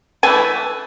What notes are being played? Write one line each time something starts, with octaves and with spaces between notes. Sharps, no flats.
E3 A3 G#5